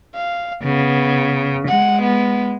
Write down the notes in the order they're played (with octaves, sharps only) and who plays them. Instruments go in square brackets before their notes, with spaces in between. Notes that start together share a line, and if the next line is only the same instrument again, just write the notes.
[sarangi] F5
[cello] C#3 [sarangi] B3
[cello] G#3 [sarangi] F#5
[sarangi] B3